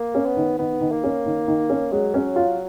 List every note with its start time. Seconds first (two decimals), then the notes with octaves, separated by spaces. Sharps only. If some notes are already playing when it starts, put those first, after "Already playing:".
Already playing: A#3
0.15 C#4
0.26 B3
0.37 D#3
0.58 D#3 B3
0.81 D#3
0.92 A#3
1.04 C#4
1.26 D#3
1.48 D#3
1.70 C#4
1.91 F#3 G#3
2.14 C#4
2.36 F4